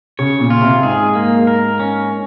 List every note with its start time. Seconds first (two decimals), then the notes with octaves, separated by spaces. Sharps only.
0.19 C#3 C#5
0.40 A#2
0.50 F4
0.61 C3
0.83 G#2 G#4
1.15 A#3
1.47 A#4
1.79 C#4